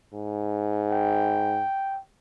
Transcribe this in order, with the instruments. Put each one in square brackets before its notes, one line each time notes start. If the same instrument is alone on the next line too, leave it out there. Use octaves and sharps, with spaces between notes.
[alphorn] G#2
[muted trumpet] G5